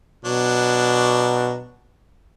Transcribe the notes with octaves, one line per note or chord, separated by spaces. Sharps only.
B2 F#3 D4